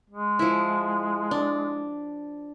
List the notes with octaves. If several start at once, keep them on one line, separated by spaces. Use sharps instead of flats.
G#3
F3 E4
D4